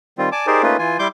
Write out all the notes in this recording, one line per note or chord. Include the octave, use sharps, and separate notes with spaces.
D#3 G3 C4 F4
D5 G#5 A5 D6
D#4 G4 G#4 A#4 C5 D5
A3 A#3 C#4 D#4 F4 B4
E3 F4 G#5
G3 E4 C6 D6 G6